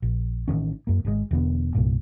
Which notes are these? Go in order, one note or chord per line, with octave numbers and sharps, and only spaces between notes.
A#1
A1 C3 D#3 C#4
F#2 A#3
G#1 B2 G#3
E1 E2 D3 B3
C2 G2 A#2